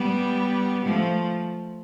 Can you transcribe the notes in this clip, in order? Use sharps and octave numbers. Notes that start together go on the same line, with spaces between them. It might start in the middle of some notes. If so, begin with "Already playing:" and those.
Already playing: G3 B3
F3 A3